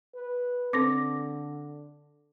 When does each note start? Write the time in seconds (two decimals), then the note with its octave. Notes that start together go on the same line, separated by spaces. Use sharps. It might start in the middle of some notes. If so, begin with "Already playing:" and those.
0.15 B4
0.73 D3 C4 A4 D6 A#6